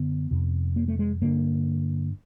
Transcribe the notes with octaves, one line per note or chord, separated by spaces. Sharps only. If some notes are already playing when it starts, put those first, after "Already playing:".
Already playing: F#2 D3 B3
F2 C3
A#3
A3
G#3
G2 D3 A#3